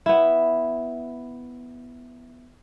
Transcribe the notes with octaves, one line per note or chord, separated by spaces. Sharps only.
B3 E4